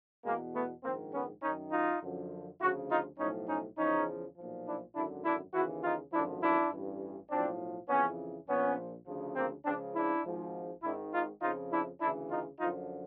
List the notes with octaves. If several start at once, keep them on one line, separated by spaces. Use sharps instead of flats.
E2 B2 G#3 A#3
A3 B3
A#1 G#2 D#3 A#3 C4
B3 C#4
F#2 D#3 C#4 D#4
D#4 F4
F#2 D3 F3
D2 C#3 F3 E4 F#4
D#4 F4
B1 A2 F3 C#4 D#4
C#4 D#4
E2 C#3 F3 C#4 D#4
B1 A#2 F3
D4 E4
G#1 F#2 D3 D4 E4
D4 E4
D#2 C#3 E3 E4 F#4
D#4 F4
G#1 F#2 D3 F3 D4 E4
D4 E4
A1 G2 E3
B1 A2 F3 C4 D4
F2 C#3 E3 B3 C#4
A#1 A#2 F3 B3 C#4
D2 C#3 F3
A#3 C4
C#2 C#3 F3 C4 D4
D4 E4
G#1 G#2 F3
G#1 G#2 D#3 D4 E4
D#4 F4
F2 C#3 F3 D#4 F4
D4 E4
D2 C#3 E3 D4 E4
D#4 F4
F#2 D3 F3 D#4 F4